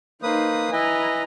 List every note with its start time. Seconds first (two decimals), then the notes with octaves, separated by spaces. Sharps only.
0.23 A#3 D#4 B4 C5 D#6
0.73 E4 B4 D#5 G#5 A#5